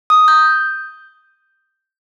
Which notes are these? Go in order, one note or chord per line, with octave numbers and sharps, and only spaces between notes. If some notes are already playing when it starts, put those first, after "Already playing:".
D#6
G6